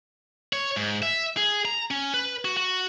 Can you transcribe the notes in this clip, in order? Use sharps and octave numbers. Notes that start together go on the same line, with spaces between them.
C#5
G#2
E5
G#4
A#5
C#4
B4
F#4
F#4